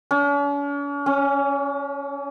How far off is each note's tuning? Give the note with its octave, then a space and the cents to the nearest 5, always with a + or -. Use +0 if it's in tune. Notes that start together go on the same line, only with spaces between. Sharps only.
C#4 +45
C#4 +0